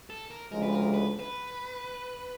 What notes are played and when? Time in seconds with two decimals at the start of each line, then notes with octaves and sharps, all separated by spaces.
0.10 A4
0.31 A#4
0.52 D2 C#3 F3 G#3 A#4
0.63 B4
0.75 A#4
0.94 B4
1.19 B4